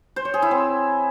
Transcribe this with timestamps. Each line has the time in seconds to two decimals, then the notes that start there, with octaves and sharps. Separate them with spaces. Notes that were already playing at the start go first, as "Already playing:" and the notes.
0.16 C5
0.25 C#5
0.34 G#4
0.42 E4
0.51 C4